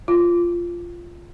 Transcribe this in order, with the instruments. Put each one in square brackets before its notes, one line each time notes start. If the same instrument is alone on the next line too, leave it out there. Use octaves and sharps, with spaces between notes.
[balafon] F4